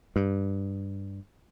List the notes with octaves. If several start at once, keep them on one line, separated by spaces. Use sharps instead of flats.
G2